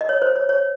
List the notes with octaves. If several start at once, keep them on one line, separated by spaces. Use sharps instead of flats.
D#5
C#5
C5
C#5
C#5